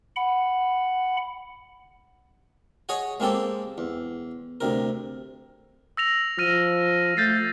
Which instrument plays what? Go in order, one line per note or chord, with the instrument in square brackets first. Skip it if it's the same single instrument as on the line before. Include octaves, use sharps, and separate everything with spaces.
[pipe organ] F#5 B5
[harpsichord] G#4 C#5 D#5 F#5
G#3 A#3 C4 G4 A4
E2
D2 C3 A#4
[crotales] E6 A#6 F7
[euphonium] F3 [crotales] F6 A#6 D#7
[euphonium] A3 [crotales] G6 A6 C7